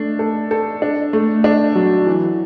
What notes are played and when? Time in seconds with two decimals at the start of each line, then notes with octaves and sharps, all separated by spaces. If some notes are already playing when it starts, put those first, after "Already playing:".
Already playing: A3 D4
0.19 A4
0.51 A4
0.82 D4
1.13 A3
1.44 D4
1.75 F#3
2.07 E3